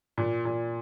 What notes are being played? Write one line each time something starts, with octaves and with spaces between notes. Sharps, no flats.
A#2
A#2